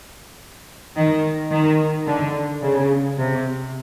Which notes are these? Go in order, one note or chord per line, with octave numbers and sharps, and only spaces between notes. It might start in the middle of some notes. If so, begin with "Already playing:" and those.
D#3
D#3
D3
C#3
C3